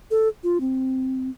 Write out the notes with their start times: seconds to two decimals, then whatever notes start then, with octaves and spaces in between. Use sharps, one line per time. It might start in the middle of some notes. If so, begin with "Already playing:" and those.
0.11 A4
0.43 F4
0.60 C4